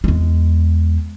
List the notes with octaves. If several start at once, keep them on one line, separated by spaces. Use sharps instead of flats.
E2 G#3